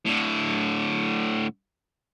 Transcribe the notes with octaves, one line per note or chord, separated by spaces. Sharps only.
A2 D3